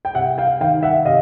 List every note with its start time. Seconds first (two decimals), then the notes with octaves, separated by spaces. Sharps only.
0.05 G5
0.15 C3 E5 F#5
0.38 F5 G5
0.60 D#3 F5 G5
0.83 E5 F#5
1.05 C3 D#5 F5